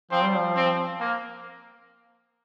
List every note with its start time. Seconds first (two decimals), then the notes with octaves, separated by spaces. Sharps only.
0.11 F3 C4
0.23 G3
0.36 F3
0.56 C4
1.00 A#3